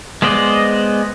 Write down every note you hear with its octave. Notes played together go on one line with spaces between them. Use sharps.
G#3 B3 C5 D5 D#5